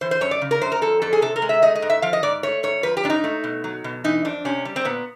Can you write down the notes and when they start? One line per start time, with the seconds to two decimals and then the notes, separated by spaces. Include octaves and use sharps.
0.01 E3 C5
0.11 C5
0.21 F#2 C#5
0.31 D5
0.41 C#3
0.51 A#4
0.61 F#2 C5
0.72 A#4
0.81 F3 A4
1.02 F2 A4
1.13 G#4
1.22 C3 A4
1.36 A#4
1.42 G#3
1.49 E5
1.62 A3 D#5
1.75 D#5
1.82 G#2
1.90 E5
2.02 F3 F5
2.13 D#5
2.23 G#2 D5
2.43 A3 C#5
2.63 G#2 C#5
2.83 F3 B4
2.97 G4
3.04 G#2 D4
3.10 D#4
3.24 A3
3.44 B2
3.64 F#3
3.84 B2
4.04 E3 D#4
4.25 F2 D4
4.45 C3 C#4
4.65 G3
4.76 C4
4.85 A#2 B3